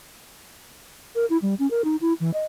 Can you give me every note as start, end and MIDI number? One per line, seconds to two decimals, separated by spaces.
1.15 1.26 70
1.30 1.37 64
1.42 1.55 55
1.59 1.69 61
1.71 1.82 70
1.85 1.96 63
2.01 2.13 64
2.20 2.31 52
2.34 2.45 75